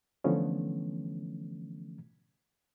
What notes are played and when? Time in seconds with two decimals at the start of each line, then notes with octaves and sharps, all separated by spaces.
0.24 D3 E3 F3 A3 B3 C#4